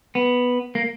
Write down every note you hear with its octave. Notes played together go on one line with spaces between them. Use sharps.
B3
A#3